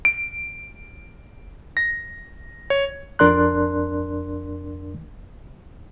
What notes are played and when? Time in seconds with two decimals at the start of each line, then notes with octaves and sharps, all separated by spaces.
0.05 D7
1.77 A#6
2.70 C#5
3.19 F2 D4 A#4 D5 C6 F#6